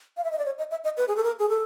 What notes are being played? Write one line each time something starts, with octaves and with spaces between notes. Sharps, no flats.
F5
E5
D#5
D5
C#5
D#5
E5
D#5
B4
G#4
A4
A#4
G#4
A4